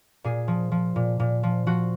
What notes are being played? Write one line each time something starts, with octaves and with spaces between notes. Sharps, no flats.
A#2 G#4
F3
F3
A#2
A#2
F3
F3 F#4